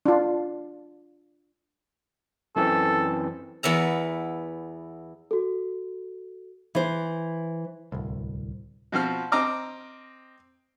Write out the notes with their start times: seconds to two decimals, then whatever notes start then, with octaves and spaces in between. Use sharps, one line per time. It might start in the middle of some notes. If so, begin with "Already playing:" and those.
0.06 D4 F4
2.56 F#2 E3 C4 A4
3.63 E2 B3 E5 A#5
5.31 F#4 A4
6.75 E3 C5
7.92 D1 C2
8.92 B2 F3 C4 F6
9.32 C4 D#5 A#5 D6 F6